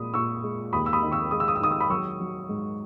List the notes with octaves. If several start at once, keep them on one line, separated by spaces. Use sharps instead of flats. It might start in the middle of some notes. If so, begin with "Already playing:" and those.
Already playing: A#2 G#3 B5 D#6
A#2 C#6 E6
G#3
D#2 B5 D#6
E6
B5 D#6
D#3
C#6 E6
G#3 D#6
E6
D#6
E6
D#3 D#6
E6
B5 D#6
F#3 C#6 E6
F#3
G#2